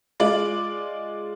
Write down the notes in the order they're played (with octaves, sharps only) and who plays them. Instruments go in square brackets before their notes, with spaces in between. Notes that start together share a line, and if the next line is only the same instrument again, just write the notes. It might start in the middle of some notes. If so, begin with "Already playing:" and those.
[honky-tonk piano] G#3 F4 D5